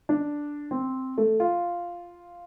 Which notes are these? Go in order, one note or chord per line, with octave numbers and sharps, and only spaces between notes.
D4
C4
A3
F4